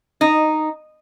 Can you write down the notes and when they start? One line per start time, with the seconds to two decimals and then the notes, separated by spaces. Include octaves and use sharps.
0.21 D#4